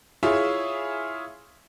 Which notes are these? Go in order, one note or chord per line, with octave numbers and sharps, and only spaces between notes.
E4 F4 G#4 C#5 E5